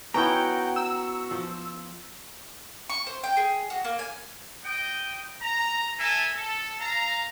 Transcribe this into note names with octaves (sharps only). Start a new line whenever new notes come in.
B3 C#4 E4 F#4 G5 A#5
E6
F3
C#6
C5
G5
G#4
F#4
A#3
G#5
D#5 G5
A#5
A4 A#4 E5 G#5 A5
A4
F5 A#5